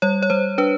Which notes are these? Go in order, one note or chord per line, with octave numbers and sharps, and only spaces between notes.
G3 C#5
C#5
G3 C5
D4 B4